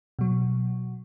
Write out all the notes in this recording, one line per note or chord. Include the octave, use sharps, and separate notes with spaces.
B2 F#3